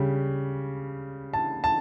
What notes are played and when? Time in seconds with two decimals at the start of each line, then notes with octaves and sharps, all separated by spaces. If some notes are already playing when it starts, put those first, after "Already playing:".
Already playing: C#3 G3
1.34 A5
1.64 A5